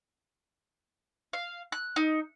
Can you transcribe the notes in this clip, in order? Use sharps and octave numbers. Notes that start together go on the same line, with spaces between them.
F5
F#6
D#4